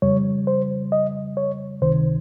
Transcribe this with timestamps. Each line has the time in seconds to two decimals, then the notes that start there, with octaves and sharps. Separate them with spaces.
0.02 F2 C#3 G3 C#5
0.47 C5
0.92 D#5
1.37 C#5
1.82 C#2 C3 D#3 C5